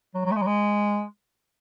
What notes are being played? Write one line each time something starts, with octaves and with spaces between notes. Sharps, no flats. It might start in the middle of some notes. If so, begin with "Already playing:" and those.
F#3
F#3
A3
G#3
F#3
G#3